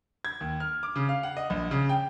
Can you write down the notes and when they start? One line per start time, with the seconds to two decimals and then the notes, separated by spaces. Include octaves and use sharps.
0.25 G#6
0.41 D#2
0.60 F6
0.83 D6
0.96 C#3
1.09 F5
1.23 F#5
1.37 D#5
1.50 A#1
1.71 C#3
1.89 G5